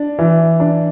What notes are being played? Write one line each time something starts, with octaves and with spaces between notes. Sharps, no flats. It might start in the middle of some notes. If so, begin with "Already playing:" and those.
Already playing: D4
E3
D4